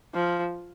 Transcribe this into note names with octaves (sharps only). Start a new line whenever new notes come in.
F3